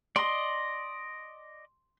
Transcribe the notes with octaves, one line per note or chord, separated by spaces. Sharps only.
D5 D#5 C6